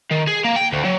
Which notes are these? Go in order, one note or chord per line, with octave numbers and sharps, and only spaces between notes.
D#3
G#4
A#3
G5
D2
F#3